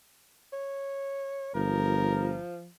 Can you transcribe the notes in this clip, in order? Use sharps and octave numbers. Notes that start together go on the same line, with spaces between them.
C#5
G1 F3 A#4